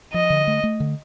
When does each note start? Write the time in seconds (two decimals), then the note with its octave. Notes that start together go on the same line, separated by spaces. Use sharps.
0.14 F3 D#5
0.30 D3
0.47 A3
0.64 A3
0.80 D3